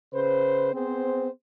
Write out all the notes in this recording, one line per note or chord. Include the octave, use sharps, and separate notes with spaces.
C#3 B4 C5
B3 C4 G#4 C5